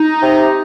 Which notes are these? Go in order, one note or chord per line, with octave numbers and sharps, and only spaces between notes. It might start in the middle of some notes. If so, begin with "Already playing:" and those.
Already playing: D#4
C3